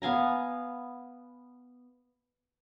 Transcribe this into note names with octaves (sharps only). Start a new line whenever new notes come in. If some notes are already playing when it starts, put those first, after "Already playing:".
B3 F5 G#5 A#5